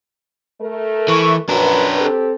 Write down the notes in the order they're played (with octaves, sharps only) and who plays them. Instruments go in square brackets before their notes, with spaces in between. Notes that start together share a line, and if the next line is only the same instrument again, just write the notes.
[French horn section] A3 A#4
[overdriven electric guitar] E3 [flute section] E5 C#6
[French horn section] F#2 [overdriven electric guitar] D4 A#4 [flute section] B4
[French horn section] C4 G4 A4